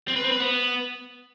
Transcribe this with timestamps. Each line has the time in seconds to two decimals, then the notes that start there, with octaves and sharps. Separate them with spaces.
0.08 C4
0.16 B4
0.24 C4
0.32 B4
0.40 B3